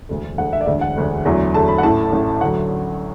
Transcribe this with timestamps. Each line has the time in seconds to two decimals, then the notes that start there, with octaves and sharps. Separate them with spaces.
0.09 E1 D2 D3
0.37 E1 D2 D3 F#5
0.53 E5
0.61 D5
0.66 E1 D2 D3 E5
0.81 F#5
0.96 E1 D2 D3
1.25 E2 D3 F#3 A3
1.54 E2 D3 F#3 A3 A5
1.68 B5
1.78 F#5
1.83 A1 A2 A3 A5
2.13 A1 A2 A3
2.41 D2 D3 F#3 F#5